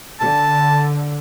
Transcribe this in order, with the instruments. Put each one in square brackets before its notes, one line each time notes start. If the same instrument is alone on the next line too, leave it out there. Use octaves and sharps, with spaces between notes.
[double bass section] D3 [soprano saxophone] A5